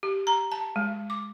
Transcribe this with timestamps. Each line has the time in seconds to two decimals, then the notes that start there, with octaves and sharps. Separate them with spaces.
0.03 G4
0.27 A#5
0.52 A5
0.76 G#3
1.10 D6